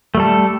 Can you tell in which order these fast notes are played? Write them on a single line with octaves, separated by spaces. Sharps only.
A3 G3 A4